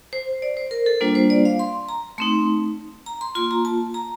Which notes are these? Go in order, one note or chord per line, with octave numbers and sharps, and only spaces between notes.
C5
D5
C5
A#4
A4
G3 A#3 D4 F4 C5
C5
D5
F5
C6
A#5
A3 C4 D#4 C6
A#5
C6
A#3 F4 C6
A#5
A5
A#5